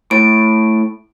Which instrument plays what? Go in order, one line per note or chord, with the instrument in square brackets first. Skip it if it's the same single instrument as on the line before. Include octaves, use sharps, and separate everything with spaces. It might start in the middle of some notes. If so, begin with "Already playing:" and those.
[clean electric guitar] A2 [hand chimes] D7